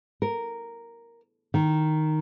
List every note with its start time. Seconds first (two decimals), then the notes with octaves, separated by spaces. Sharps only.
0.22 A#4
1.54 D#3